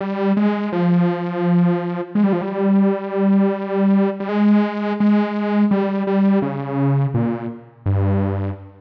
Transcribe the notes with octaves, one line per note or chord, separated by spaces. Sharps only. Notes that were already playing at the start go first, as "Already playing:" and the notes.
G3
G#3
F3
G#3
G3
F3
G3
G3
G#3
G#3
G3
G3
C#3
A#2
G2